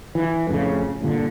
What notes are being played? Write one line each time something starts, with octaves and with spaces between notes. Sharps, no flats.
E3
F2 A2 C#3
G1 A#2 D3